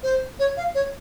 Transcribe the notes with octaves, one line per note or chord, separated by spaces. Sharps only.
C5
C#5
F5
C#5